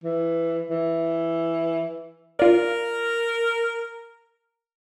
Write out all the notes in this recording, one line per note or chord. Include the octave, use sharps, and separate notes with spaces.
E3
E3
F4 A#4 D5